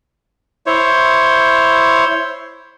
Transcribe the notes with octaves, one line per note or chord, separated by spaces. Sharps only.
E4 C5 C#5